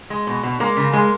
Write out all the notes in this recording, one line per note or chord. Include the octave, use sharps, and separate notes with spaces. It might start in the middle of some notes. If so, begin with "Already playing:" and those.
G#3
B2
B2
G#3 A#3
C#3
G#3